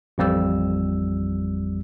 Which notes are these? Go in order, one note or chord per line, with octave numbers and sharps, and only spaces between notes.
A1 F2 G3 E6